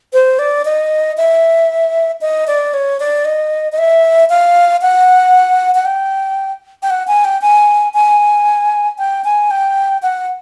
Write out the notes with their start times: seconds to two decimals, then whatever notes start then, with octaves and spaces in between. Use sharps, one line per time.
0.13 C5
0.39 D5
0.65 D#5
1.17 E5
2.21 D#5
2.47 D5
2.73 C#5
3.00 D5
3.25 D#5
3.72 D#5
3.78 E5
4.30 F5
4.82 F#5
5.75 F#5
5.85 G5
6.83 G5
6.90 F#5
7.07 G#5
7.24 G5
7.42 G#5
7.94 G#5
8.99 G5
9.24 G#5
9.51 G5
10.02 F#5